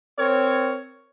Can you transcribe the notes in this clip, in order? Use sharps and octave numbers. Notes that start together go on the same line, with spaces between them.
C4 A#4 C#5